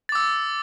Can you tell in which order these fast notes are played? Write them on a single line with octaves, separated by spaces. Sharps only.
A6 D6 E6